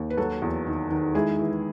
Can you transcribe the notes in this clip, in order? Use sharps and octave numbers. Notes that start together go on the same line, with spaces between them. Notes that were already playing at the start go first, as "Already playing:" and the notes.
Already playing: D#2
B4
F#3 F#4 A4
E2
D#3
D#3
G#3 E4 G#4
E3